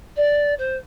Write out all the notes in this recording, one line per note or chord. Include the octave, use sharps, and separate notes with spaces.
D5
C5